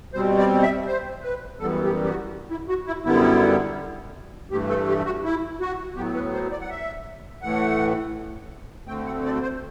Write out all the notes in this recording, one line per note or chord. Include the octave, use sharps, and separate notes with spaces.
B2 G3 C4 C5
D5
E5
C5
B4
F#2 E3 G3 B3 A4
G4
G4
F#4
E4
F#4
E4
F#2 D3 G3 B3 E4
G2 E3 A3 G4
A4
G4
F#4
E4
F#4
A2 F#3 B3 G4
B4
C5
D5
F#5
E5
A2 E3 A3 F#5
D2 D3 A3 C4 G5
F#5
D5
C5